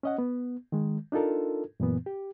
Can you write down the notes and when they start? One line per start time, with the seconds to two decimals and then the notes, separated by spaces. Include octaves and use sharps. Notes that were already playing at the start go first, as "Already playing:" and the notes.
0.03 C#4 D#5 F#5
0.18 B3
0.72 D#3 G#3
1.12 D4 D#4 F4 A4 A#4
1.80 F#2 A#2 E3 B3
2.06 G4